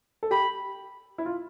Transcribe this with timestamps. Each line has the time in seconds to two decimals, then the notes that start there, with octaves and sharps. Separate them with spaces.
0.23 A4
0.31 G4 B5
1.18 E4
1.26 F4